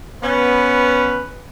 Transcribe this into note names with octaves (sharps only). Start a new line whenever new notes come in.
B3 C#4 B4